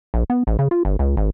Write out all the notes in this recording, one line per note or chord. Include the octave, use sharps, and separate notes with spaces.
A#1
B3
A1
C#3
F4
G1
C#2
G#1